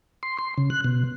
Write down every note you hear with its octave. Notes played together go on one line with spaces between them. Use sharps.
C6
C6
C#3
F#6
B2